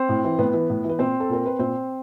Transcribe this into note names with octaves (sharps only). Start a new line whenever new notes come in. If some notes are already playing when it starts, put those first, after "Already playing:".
Already playing: C4 C5
A2
E3
A2 B3 B4
E3
A2
E3
B4
A#2 C4 C5
A4
A#2 A#4
B4
A#2 C4 C5